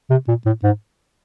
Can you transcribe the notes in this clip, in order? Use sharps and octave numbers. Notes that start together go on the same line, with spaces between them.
C3
A#2
A2
G#2